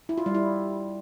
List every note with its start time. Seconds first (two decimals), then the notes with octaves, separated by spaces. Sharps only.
0.09 E4
0.18 F4
0.26 G3
0.35 E4